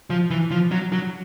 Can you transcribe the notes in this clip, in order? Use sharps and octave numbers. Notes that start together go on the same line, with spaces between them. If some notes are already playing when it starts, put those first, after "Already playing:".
F3
E3
F3
F#3
F#3